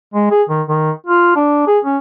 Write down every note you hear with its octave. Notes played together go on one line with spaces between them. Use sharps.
G#3
G#4
D#3
D#3
F4
D4
G#4
C#4